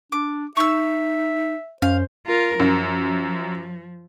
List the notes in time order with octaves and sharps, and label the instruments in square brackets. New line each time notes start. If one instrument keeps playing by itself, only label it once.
[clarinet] D4 [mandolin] D6
[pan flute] D#4 [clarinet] E5 [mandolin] C#6 E6
[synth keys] F#2 C#4 [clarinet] C5 [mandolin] F5
[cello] F4 A#4
[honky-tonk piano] F#2 [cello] F3